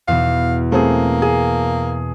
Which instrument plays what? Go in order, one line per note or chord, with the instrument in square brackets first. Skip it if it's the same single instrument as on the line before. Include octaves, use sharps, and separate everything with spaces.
[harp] E2 B2 [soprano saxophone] F5
[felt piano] A3 C4 G#4 [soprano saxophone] A#3
[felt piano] G#4 [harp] A5